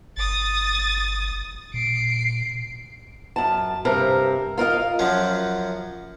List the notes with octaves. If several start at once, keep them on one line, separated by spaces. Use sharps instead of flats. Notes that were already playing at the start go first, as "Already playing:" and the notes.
G1 D#6 A6
A#2 C7 D7
F#2 A5
G2 C3 A#4
F4 A#4 D#5 F5
F#2 F3 F#3